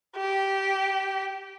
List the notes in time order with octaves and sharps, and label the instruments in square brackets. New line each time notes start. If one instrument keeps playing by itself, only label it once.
[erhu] G4